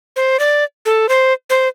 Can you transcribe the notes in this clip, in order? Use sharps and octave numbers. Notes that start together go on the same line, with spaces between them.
C5
D5
A4
C5
C5